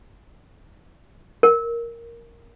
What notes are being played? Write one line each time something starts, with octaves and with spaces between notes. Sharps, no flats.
A#4